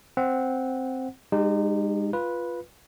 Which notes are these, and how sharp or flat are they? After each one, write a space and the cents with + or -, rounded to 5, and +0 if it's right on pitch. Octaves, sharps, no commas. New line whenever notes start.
C4 +0 F#5 +0
G#3 -30 D#4 -30 G4 +0
F4 +0 B4 -10